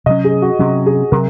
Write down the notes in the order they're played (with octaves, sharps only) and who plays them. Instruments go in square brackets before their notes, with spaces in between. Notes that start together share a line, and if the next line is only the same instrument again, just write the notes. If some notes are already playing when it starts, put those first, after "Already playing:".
[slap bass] C3 F#3 C#4 [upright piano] D#5
[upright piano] G#4
F#4
[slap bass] C3 F#3 C#4 [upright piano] F#4
[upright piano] G#4
[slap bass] C3 F#3 [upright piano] A#4